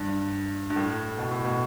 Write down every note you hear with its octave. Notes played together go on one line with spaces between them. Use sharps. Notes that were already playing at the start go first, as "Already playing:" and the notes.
Already playing: G2
G2
A2
B2
A2
B2